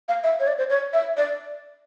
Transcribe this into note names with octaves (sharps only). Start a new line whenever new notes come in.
F5
E5
C#5
D5
C5
C#5
E5
D5